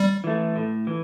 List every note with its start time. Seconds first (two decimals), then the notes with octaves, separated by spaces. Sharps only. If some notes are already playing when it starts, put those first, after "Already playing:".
Already playing: G3
0.24 E3 A3
0.56 A2
0.87 E3